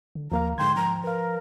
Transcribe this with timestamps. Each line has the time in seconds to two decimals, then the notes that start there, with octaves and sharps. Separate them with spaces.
0.15 D3
0.31 D#2 F3 A#3 F5 A#5
0.58 G#2 D3 G5 C6 G#6
0.76 F3 A#5
1.04 A#4 B4 F5